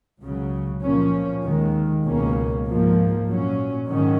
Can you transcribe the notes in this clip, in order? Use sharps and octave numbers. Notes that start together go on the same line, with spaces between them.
C#2 C#3 F#3
A#2 F3 A#3 C#4
D#2 D#3 G#3
C#2 B2 A#3 C#4
G#2 F3 A#3
A#2 F#3 C#4
G#2 D#3 F#3 C#4